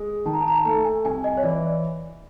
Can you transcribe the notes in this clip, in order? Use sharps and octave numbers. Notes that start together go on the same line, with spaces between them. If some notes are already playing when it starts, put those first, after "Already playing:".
Already playing: G#3
D#3 A5
A#5
A5
A#5
A5
A3 A5
G#5
C2 G#5
D#5
C#5
E3 D5